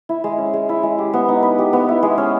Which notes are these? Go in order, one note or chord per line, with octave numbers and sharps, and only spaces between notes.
E4
G#3
C#4
G#3
E4
G#3
G4
B3
D#4
B4
G4
B3
E4
G#3
C#4